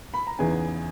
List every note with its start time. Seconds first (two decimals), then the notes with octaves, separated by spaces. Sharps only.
0.14 B5
0.27 A#5
0.39 E2 C#3 E3 B3 D#4 G#4 G#5